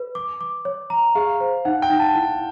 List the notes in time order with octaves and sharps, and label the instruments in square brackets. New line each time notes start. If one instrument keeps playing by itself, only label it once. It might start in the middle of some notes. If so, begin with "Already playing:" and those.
Already playing: [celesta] B4
D6
D6
C#5
A#5
[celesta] G#4 [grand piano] F5
[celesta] C5
[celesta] D#4 [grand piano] F#5
[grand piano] G5
[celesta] D#4
[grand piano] A5
[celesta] E4